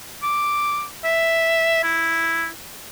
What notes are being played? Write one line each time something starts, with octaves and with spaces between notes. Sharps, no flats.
D6
E5
E4